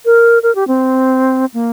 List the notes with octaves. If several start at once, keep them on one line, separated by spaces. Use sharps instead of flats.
A#4
A#4
G4
C4
A#3